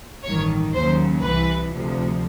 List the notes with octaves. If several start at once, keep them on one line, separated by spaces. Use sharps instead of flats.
A1 G2 D#3 C#5
D#2 C#3 F#3 C5
C2 C3 E3 B4
D2 C3 F3